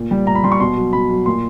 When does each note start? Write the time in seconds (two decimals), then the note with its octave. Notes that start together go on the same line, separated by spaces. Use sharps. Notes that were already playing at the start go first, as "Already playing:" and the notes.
Already playing: A#2
0.11 G3
0.27 A#2 A#5
0.35 B5
0.44 G3 C6
0.52 C#6
0.60 B2 C6
0.77 F#3
0.93 B2 B5
1.10 F#3
1.26 A#2 C6